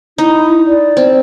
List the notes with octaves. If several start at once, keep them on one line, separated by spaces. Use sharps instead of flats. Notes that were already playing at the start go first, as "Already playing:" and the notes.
D#4 E4
D5
C4